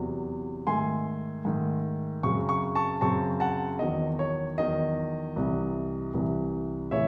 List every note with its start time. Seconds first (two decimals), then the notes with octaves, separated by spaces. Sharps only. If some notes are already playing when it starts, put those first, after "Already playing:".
Already playing: E2 C3 F#3
0.67 G#2 D#3 A3 G#5 C6
1.45 G#2 D#3 A3
2.23 F#2 C#3 F#3 C4 C#6
2.49 C#6
2.75 A5 C#6
3.01 F#2 C#3 F#3 C4 A5 C#6
3.40 F#5 A5
3.79 E2 D#3 F#3 D#5
4.19 C#5
4.58 E2 D#3 F#3 D#5
5.36 C2 C3 E3
6.14 C2 C3 E3
6.91 C#3 E3 A3 C#5 E5